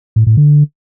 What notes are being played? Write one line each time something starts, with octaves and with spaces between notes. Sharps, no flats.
A2
A2
D3